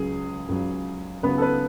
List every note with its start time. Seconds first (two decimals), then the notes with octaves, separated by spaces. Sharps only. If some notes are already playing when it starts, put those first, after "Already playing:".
Already playing: C#2 C#3 F#3 G#4
0.49 C#2 C#3 F#3
1.23 C#2 C#3 F#3 B3 B4
1.38 A4
1.42 B3 B4